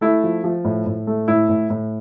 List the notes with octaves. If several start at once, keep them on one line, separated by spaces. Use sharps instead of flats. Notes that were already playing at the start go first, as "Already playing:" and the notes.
A3 E4
F3
F3
A2
A2
A3
A2 E4
A2
A2